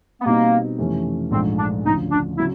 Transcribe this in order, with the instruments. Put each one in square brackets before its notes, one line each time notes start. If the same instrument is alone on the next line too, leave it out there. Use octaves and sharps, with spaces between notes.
[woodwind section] B3
[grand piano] B2 G3 C4 D#4 [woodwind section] A#3
[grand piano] F2 C3 E3 A3 C#4
[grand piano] A#1 G#2 F3 A3 [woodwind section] C4
[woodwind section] D4
[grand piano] D2 C#3 F3 [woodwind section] D#4
[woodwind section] D4
[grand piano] C#3 F#3 [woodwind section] E4